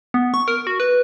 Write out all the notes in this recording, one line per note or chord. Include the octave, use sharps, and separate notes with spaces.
B3
C#6
A#4
F#4
B4